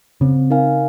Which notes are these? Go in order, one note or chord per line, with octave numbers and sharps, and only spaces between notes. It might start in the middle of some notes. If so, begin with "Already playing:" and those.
C#3 C4
D#4 A#4 F5 G#5